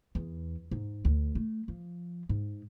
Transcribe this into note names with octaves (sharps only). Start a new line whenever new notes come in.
E2
G#2
D2
A3
F3
G#2